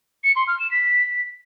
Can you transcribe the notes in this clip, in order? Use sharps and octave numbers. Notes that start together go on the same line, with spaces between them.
C#7
C6
F6
E7
B6